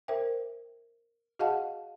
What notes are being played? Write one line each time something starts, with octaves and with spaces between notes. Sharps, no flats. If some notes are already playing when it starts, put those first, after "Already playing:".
A#4 C5 E5 G5
F#4 G#4 D#5 F5 F#5 A5